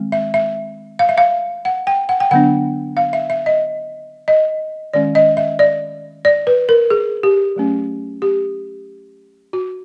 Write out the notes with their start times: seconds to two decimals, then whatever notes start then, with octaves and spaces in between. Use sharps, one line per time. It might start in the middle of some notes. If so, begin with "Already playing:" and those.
Already playing: D#3 G#3 C4
0.12 E5
0.34 E5
0.99 F5
1.09 E5
1.18 F5
1.65 F#5
1.87 G5
2.09 F#5
2.20 G5
2.31 D3 F#3 B3 D4 F#5
2.97 F5
3.13 E5
3.30 E5
3.46 D#5
4.28 D#5
4.93 D#3 G#3 C#4 D5
5.15 D#5
5.37 E5
5.59 D5
6.25 D5
6.47 B4
6.69 A#4
6.90 G#4
7.23 G4
7.56 F#3 A3 C#4
8.22 G4
9.53 F#4